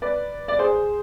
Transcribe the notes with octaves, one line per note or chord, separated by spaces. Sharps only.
B4 D5
D5
G#4 C5